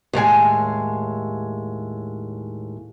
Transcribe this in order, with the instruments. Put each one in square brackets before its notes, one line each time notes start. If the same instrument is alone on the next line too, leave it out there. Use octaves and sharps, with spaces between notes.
[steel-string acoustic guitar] D#2 A2 G#3 G#5